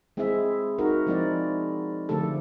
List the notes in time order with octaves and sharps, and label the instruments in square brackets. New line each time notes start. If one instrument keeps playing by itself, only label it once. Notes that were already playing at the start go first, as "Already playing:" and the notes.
[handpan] G#3 C4 E4 G#4 E5
D#4 F#4 A#4
F3 G#3 C4 E4 D5
D3 F3 A3 G4 A4